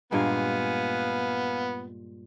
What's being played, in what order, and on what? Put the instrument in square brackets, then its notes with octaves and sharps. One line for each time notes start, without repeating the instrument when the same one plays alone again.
[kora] G2 A#2 G#3 [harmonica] B3 [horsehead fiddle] F5 G#5